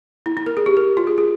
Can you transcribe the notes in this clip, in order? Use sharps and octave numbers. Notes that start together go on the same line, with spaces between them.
E4
E4
A#4
G#4
G4
A#4
F4
G#4
G#4